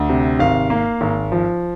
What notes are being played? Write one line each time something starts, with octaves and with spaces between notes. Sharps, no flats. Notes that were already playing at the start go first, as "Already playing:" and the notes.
Already playing: D2
C3
G#1 F5
A#3
G#1
F3